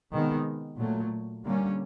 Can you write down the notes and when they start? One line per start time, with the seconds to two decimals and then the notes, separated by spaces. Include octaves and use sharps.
0.13 C3 D#3 G#3 B3
0.78 A#2 F#3 A3
1.43 D3 G3 A#3 C#4